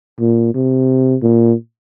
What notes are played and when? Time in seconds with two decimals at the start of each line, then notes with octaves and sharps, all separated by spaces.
0.20 A#2
0.54 C3
1.22 A#2